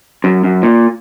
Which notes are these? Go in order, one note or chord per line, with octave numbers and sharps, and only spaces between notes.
F#2
F#2
A#2